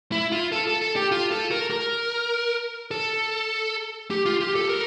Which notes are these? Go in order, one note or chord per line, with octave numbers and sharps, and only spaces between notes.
E4
F4
A4
A4
A4
G4
F4
A4
A#4
A#4
A4
G4
F4
G4
A4
A#4